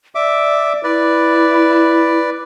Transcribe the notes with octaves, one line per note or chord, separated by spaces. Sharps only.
D5 E5 D6
E4 B4 D5